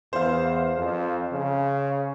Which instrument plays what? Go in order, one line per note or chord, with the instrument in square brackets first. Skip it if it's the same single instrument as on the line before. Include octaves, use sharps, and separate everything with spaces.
[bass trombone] E2 [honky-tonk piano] C5 F5
[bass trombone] F2
C#3